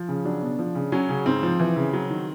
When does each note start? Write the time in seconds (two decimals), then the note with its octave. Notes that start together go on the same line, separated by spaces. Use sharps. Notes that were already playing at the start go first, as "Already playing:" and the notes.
Already playing: F3
0.08 C#3
0.25 F#3 D4
0.42 B2
0.59 F3
0.75 C#3
0.92 F#3 C#4
1.09 C#3
1.26 G#2 C4
1.43 F3
1.60 E3
1.76 C#3
1.93 F#3
2.10 D#3